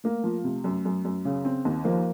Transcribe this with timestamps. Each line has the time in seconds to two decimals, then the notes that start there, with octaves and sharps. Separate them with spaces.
0.04 A3 A#3
0.24 F3
0.44 C3
0.64 F#2
0.85 F#2
1.05 F#2
1.25 C#3
1.45 C4
1.65 D#2
1.85 F3 A#3